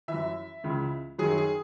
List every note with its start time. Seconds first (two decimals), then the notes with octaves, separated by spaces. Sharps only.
0.08 E3 E5
0.14 F#2
0.63 C#2 C#3 E3
1.18 F#2 D#3 F#3 G#4
1.38 G#4